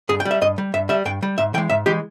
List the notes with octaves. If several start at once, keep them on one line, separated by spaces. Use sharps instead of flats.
G2 G#4
G5
G3
E5
G2 D#5
G3
G2 E5
G3 E5
G2 G5
G3
G#2 E5
E3 G#3 G5
G#2 E5
E3 G#3 G4